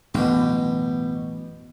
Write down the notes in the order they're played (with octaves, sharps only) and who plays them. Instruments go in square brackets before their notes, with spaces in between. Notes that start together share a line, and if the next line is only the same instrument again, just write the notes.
[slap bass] A1 F#2 [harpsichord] B2 G4